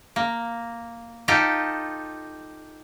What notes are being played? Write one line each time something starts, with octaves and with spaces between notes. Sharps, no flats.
A#3
D#4 F4 G4 A4